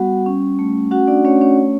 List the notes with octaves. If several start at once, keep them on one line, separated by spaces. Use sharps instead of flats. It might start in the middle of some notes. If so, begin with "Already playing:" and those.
Already playing: G3 B3 F#4 F#5
C#4
A3
C#4 F#4 F#5
D4 D5
A3 C#4 C#5
C#4 C#5
C#4